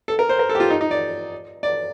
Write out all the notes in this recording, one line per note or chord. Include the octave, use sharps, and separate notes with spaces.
A4
A#4
C5
A#4
A4
G4
F4
D#4
D#4
D5
D5